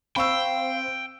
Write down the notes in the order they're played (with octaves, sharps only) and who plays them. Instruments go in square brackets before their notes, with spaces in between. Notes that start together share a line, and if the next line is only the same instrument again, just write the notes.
[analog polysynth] C4 [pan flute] F5 [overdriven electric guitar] G5 [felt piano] B5 C#6 E6